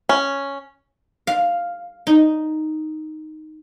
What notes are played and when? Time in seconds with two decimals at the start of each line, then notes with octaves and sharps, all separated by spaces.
0.09 C#4
1.27 F5
2.07 D#4